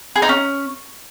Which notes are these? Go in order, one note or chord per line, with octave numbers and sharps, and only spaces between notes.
G#4
D#4
C#4